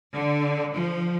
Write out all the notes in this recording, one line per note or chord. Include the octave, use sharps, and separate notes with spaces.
D3
F3